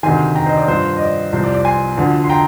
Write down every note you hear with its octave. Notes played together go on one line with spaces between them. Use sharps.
D2 C3 D#3 G#5 C6
G5 A#5
C5 D#5
D5
G2 F3 C5
D#5
D5
C2 C3 F3 C5
D5
D5
G#5 C6
D2 D3 F3
C6
G5 A#5